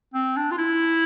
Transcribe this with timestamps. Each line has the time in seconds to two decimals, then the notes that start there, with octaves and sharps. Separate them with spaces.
0.14 C4
0.36 D4
0.51 F4
0.58 E4